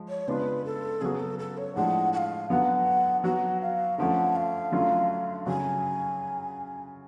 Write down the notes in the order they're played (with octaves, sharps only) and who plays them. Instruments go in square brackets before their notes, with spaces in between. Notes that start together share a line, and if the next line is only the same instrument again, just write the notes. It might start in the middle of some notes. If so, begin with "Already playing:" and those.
Already playing: [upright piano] F3 G#3
[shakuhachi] C#5
[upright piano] C#3 G#3 B3 D4 F4 [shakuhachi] B4
[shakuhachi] A4
[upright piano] C#3 F#3 B3 F#4 [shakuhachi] G#4
[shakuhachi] A4
A4
C#5
[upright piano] A2 F3 G#3 D4 G#4 [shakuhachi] F#5
[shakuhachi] F#5
F5
[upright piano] D3 F#3 B3 [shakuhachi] F#5
[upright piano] F#3 B3 F#4 [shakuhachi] F#5
[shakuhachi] F5
[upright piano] D3 F3 A3 C#4 [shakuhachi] F#5
[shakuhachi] F5
[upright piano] D3 F#3 A3 C#4 F4
[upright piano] C#3 F#3 C#4 F#4 [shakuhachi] G#5